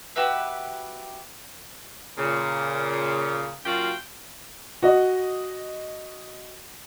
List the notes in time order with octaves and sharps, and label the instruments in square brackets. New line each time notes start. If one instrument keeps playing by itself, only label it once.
[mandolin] F#4 G4 B4 E5
[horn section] A#2 C#3
F#2 A#2 F4 F#4 F5 G5
[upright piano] F#4 D#5